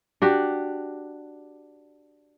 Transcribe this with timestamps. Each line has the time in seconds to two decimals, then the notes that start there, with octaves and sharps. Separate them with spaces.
0.22 D4 F#4 G4